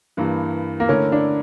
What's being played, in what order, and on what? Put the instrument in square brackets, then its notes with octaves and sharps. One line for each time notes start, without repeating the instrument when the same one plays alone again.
[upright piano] G2 E3 A#3
[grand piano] A#3
[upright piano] D3 A3 E4 A#4 [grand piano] C#4
[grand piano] D4